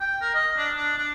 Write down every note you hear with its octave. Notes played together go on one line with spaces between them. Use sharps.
G5
A#4
D#5
D4
D4
D4